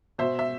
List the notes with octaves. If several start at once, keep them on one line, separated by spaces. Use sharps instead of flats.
B2 C5 E5
E5